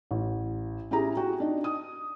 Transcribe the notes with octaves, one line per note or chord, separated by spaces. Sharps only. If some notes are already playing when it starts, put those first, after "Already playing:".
A1
C#4 E4 G4 G#4 A#5
F#4 G5
D4 D#4
D#6